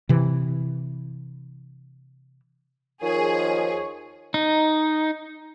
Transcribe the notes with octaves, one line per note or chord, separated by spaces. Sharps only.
C3 E3
D#2 D#3 F3 G#4 C#5
D#4